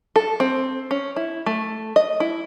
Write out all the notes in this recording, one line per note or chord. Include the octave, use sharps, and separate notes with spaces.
A4
C4
C#4
E4
A3
D#5
E4